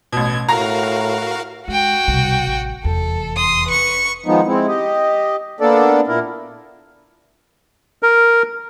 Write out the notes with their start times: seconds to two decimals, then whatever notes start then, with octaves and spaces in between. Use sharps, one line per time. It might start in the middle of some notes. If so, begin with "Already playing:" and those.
0.13 A1 B2 G#6
0.48 A2 F#4 A#4 F5 A#5
1.68 G#3 F#4 G5
2.08 C2 B2
2.47 A1
2.84 F1 E2 A4
3.37 C6 D#6
3.68 B4 C#6
4.26 D#3 F3 G#3 B3 D#4
4.47 G#3 C4 E4
4.67 G4 D#5
5.60 A#3 B3 D4 A4 D5
6.07 A#2 E4 A#4
8.03 A#4